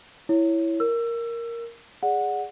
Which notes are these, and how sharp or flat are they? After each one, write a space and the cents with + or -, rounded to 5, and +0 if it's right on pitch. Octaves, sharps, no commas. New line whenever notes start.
E4 +0 C#5 +0
A#4 +0 E6 +25
G#4 -10 D5 +0 F#5 -15